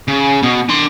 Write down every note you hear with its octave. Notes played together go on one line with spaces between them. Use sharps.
C#3
B2
D4 C6